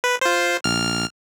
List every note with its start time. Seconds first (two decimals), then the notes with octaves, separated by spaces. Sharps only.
0.04 B4
0.21 F4 C5
0.64 A#1 F6